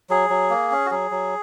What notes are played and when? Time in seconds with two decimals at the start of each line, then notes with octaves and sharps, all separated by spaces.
0.10 F#3 G#4
0.30 F#3
0.50 A#3
0.71 C#4
0.86 F#4
0.90 F#3 G#4
1.11 F#3